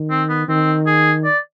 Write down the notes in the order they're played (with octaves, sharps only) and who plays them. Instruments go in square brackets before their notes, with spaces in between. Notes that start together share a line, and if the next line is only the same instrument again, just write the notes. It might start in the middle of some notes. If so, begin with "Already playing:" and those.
Already playing: [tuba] D#3
[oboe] C4
B3
[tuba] D#3 [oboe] C4
[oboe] G#4
D5